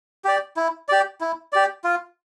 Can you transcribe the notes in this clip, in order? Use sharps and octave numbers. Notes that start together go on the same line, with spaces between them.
G4 D5
E4
G4 D5
E4
G4 D5
F4